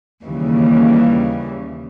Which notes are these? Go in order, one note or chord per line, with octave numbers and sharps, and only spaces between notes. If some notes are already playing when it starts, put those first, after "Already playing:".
D#2 C#3 E3 G3